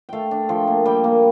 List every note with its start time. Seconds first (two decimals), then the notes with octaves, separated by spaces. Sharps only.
0.09 A3 F5 G5
0.31 D4
0.49 F3 G5
0.67 A#3
0.85 G3 G5
1.04 A#3